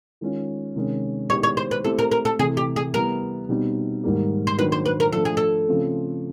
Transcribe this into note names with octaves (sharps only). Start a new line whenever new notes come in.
D#3 G#3 C#4 F4
C3 D#3 G#3 C#4
D#3 G#3 B3 E4 G4 C#5
C#5
C5
B4
A3 C4 E4 G4 A4
A#4
A#4
A4
C3 E3 A3 G#4
G4
G#4
G3 B3 E4 A#4
B2 G3 C4 D#4
G#2 D#3 G3 A#3
C5
D#3 F#3 A#3 D4 B4
C5
B4
A#4
F3 A3 D4 A4
G#4
A4
C#3 F3 A3 C4